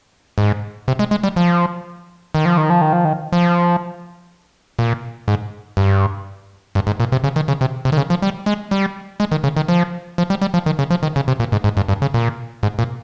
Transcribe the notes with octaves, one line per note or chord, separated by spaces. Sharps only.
G#2
C3
G#3
G#3
G3
F3
D#3
F3
D#3
F3
D#3
F3
D#3
F3
A#2
G#2
G2
G2
G#2
A#2
C3
C#3
D#3
C#3
C3
C3
D#3
C#3
F3
G3
G#3
G3
G#3
D#3
C#3
D#3
F3
F3
G3
G3
F3
D#3
C#3
F3
D#3
C#3
C3
A#2
G#2
G#2
G2
G2
C#3
A#2
G#2
A#2